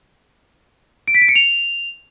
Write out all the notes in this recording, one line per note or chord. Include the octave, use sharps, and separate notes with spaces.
D7
B6
D7
C#7
F7